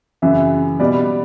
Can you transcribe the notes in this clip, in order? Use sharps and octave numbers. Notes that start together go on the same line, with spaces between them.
F#2 C#3 E3 E5
B2 G3 B3 D5